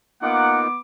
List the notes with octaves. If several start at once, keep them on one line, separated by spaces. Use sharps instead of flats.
A#3 B3 D#4 F4 F#5 D6